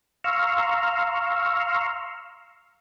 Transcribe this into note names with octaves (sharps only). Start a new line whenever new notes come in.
F5 A#5 C6 C#6 E6 F6